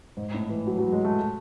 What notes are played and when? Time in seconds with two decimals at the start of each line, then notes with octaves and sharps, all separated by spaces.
0.17 G#2
0.34 A2
0.50 E3
0.67 F#3
0.79 F#3
0.92 G#3
1.05 A3